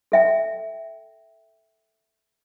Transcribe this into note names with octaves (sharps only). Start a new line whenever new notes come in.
A4 E5 G5